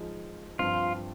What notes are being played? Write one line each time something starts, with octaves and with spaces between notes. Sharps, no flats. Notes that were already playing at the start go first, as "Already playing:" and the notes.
Already playing: F3 G#3 D#4 G#4
G2 F3 C4 F4